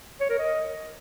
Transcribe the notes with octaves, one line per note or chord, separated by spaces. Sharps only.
C#5
A#4
D#5